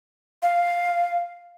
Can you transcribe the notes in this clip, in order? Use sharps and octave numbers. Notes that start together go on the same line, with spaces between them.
F5